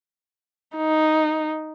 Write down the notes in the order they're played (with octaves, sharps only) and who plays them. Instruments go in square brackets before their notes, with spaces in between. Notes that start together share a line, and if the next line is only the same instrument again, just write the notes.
[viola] D#4